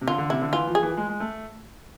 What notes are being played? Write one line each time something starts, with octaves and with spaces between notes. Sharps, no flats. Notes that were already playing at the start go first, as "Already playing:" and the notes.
C3
D3 F4
D3
C3 E4
D3
E3 F4
F3
G#4
E3
F3
G#3
G#3
A3